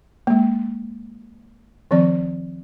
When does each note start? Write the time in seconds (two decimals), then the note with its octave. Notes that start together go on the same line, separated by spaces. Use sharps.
0.27 G#3 A#3
1.91 D#3 F3 C4 D5